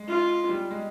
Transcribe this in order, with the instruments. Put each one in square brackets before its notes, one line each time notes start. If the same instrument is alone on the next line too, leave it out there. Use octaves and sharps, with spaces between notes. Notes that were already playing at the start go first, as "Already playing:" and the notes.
Already playing: [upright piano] G#3
[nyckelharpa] F4
[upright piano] G3
G#3